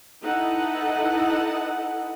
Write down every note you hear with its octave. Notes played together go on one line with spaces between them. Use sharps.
D#4 E4 A4 B4 D#5 F#5